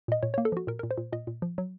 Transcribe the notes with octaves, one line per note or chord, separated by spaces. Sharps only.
A#2 D#5
A#2 C#5
A#3 C#5
A4
F3 F#4
A#2 A#4
A#2 A#4
C5
A#2
A#2 D#5
A#2
F3
F#3